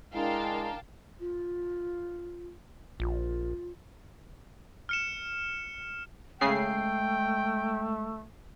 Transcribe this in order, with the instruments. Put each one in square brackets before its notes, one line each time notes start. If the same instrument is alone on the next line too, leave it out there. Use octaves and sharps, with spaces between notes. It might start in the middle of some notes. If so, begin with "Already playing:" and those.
[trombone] G#3 [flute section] D4 A#4 A#5 [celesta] E4 [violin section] F5 G5 A5
[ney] F4
[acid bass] A#1 [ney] F4
[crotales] F6 C#7 E7
[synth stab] C#3 G#4 C7 [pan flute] G#3 [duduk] A3 [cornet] G5